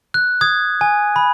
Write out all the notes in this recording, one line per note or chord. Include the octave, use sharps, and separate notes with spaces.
F#6
D#6 G#6
G#5
B5